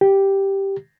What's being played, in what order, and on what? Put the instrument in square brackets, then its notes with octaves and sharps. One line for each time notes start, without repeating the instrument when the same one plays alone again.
[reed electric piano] G4